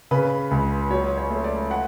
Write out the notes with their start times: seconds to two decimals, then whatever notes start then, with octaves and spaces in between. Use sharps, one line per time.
0.11 C#3 B4
0.51 C#2
0.90 F#3 C#5
1.18 C#5
1.30 A3
1.44 D5
1.71 F#5